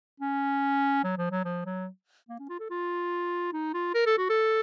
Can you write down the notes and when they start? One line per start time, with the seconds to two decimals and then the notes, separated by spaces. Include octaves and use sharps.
0.20 C#4
1.04 F#3
1.18 F3
1.31 F#3
1.45 F3
1.66 F#3
2.29 A#3
2.39 C#4
2.49 F4
2.60 A4
2.70 F4
3.53 D#4
3.74 F4
3.94 A#4
4.06 A4
4.18 F#4
4.30 A4